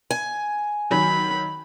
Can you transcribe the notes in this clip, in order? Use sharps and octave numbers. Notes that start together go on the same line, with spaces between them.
G#5
D#3 F#3 B5